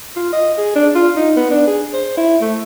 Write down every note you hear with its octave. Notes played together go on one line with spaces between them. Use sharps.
F4
D#5
G#4
D4
F4
D#4
B3
D4
G#4
C5
E4
A3